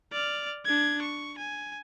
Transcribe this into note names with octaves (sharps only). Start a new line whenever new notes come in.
D5 F6
D4 G#6
C#6
G#5